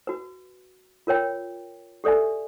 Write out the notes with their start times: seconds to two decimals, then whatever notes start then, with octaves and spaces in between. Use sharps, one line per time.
0.07 F#4 B4
1.07 F4 A#4 C#5 G5
2.04 G4 A4 D5 E5 G#5